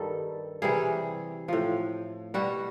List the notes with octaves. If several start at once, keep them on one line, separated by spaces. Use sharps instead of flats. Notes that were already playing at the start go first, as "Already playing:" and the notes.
Already playing: G2 D#3 G3 A4
C3 E3 G3 G#4
A2 F3
B2 G3 F#4